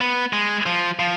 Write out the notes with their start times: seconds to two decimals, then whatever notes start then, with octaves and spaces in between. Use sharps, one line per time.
0.01 B3
0.33 G#3
0.66 F3
0.99 F3